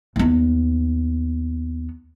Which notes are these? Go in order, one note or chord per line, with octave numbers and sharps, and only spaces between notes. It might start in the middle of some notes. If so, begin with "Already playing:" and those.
D#2 B3